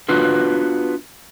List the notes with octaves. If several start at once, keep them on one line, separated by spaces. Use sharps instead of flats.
B3 D4 F4 F#4 B4